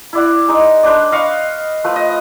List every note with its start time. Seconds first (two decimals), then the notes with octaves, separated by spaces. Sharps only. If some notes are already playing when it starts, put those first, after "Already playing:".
0.13 E4 D5 F#5
0.48 G#3 D#4
0.83 D4 B4 C5 D5
1.12 D#5 F5 C#6
1.84 F3 A3 B4
1.96 D#5